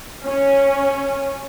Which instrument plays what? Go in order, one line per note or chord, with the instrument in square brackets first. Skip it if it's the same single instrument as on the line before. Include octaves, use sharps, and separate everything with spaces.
[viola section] C#4